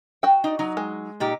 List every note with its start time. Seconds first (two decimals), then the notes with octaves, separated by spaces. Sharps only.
0.23 F#4 G5
0.44 D#4 D5
0.59 F#3 D#4
0.77 G#3
1.20 A#2 D#4 G4